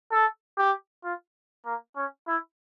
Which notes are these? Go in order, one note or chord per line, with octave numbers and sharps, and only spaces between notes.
A4
G4
F4
A#3
C#4
E4